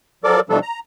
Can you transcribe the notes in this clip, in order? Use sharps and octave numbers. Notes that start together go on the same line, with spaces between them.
F3 F#3 A4 A#4 D5 D6
B2 E3 F3 G3 D4 A4
A#5